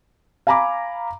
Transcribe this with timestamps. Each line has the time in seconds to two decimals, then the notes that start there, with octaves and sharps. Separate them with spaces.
0.47 F5 G#5 A#5 B5 D6